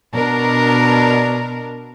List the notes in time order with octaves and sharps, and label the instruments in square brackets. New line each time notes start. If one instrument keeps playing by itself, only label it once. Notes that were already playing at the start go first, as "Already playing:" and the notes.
[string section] B2 D4 A#4